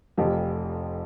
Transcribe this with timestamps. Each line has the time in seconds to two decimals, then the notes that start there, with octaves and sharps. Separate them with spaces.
0.17 F1 F2 F3 G4